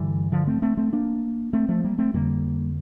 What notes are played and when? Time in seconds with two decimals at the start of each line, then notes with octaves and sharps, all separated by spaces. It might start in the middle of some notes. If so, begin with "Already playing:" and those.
Already playing: G2 D3 E3 G3
0.32 D3 F3
0.47 A3 C4
0.62 A3 C4
0.77 A3 C4
0.93 A#3 D4
1.53 A3 C4
1.69 F3 A3
1.84 G3 A#3
1.98 A3 C4
2.14 F2 D3 G3 A#3